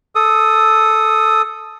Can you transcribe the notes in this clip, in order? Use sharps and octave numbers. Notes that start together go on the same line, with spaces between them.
A4 D#6